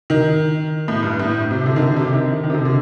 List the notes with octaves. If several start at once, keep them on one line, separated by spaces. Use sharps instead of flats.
D#3
A2
G2
A2
C3
D3
D#3
D3
C3
D#3
D#3
C3
D3
D3